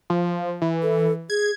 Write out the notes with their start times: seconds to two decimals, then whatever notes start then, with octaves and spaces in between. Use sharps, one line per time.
0.10 F3
0.62 E3
0.82 A4
1.30 G#4 G#6